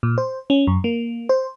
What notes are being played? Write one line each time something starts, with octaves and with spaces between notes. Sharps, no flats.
A#2
C5
C#4
F#2
A#3
C5